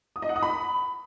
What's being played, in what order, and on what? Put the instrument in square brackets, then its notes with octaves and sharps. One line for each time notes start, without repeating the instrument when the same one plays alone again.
[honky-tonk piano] D#6
D#5
F#5
D#6
B5